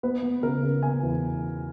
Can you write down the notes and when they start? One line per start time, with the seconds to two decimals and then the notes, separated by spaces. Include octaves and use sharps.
0.03 B3 B4
0.23 B3
0.43 C#3 A#4
0.63 C#3
0.83 B3 G#5
1.03 E2